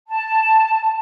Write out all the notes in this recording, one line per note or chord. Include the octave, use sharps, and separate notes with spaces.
A5